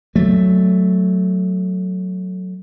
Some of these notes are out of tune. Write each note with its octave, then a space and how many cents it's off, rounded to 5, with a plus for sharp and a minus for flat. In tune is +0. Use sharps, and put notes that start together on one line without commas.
F#3 +0 A3 -5